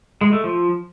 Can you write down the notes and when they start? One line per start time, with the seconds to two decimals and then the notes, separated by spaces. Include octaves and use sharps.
0.21 G#3
0.33 A3
0.44 F3